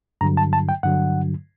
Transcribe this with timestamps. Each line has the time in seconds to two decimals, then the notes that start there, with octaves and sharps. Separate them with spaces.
0.21 G2 D3 F#3 A#5
0.37 A5
0.53 A5
0.69 G5
0.83 G2 D3 F#3 F#5